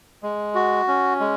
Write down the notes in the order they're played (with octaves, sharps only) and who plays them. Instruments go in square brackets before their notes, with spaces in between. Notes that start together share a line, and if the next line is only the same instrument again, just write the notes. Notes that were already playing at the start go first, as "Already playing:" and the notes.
[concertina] G#3
F#4
C#4
G#3